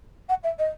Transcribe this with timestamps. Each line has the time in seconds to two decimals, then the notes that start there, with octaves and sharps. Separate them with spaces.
0.29 F#5
0.43 E5
0.58 D#5